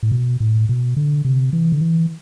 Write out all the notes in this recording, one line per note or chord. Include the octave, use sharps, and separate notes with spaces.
A2
B2
A2
B2
D3
C3
E3
D3
E3